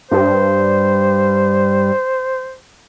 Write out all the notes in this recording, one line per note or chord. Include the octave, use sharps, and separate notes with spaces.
G2 C5